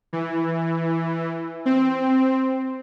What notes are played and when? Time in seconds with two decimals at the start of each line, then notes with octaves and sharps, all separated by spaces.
0.13 E3
1.66 C4